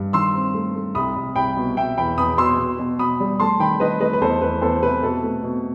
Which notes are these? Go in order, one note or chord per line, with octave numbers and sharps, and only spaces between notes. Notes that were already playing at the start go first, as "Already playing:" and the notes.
Already playing: G2
D#3 C6 E6
C4
A3
A3
C2 B5 D#6
C2
C2 G5 B5
B2
B2 E5 G5
E2 G5 B5
E2 B5 D#6
B2 C6 E6
B2
B2
B2 B5 D#6
G3
A3 A5 C6
D#3 G5 B5
D#3 B4 D#5
A3 B4 D#5
B4
E2 A4 C5
E2 B4
E2 A4 C5
C3 B4
B2 A4
A3
B2